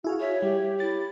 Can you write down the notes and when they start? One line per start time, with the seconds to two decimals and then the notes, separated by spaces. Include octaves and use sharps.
0.04 E4 F#4 G#4 F5
0.20 C#5 E5
0.42 G3 G4
0.80 E4 A6